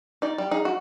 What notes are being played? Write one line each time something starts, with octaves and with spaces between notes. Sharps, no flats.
D#4 D5
G3
D#4 G#4
F#4